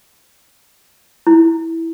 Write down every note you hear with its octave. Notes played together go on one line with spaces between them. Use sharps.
E4